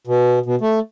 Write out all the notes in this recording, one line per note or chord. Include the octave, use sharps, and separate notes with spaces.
B2
B2
A3